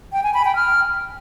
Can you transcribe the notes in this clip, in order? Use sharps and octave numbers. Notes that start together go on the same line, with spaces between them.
G5
G#5
B5
G5
F6